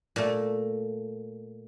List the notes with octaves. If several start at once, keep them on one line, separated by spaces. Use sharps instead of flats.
A#2 A3